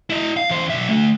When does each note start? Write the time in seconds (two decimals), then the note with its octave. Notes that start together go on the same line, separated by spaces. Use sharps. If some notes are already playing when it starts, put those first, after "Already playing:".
0.10 E4 D#5
0.37 F5
0.50 E2 C5
0.70 B1 E5
0.89 D3 A3